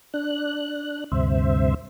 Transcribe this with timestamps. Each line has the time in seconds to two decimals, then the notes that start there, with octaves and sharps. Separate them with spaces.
0.14 D4 F#6
1.12 D2 G2 C3 C5 E5